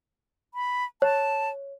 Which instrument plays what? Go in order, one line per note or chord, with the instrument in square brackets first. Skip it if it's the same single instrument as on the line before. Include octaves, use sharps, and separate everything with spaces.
[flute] B5
[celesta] C#5 [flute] A5